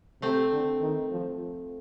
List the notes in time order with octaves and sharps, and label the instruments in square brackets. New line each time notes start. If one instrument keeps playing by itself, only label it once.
[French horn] C3 [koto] A3 C4
[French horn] D3
D#3
F3